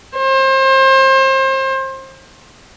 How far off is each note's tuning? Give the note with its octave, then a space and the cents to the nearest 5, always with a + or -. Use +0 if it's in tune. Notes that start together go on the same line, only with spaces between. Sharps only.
C5 +30